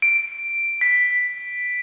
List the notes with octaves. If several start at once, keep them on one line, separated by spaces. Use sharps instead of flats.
D7
B6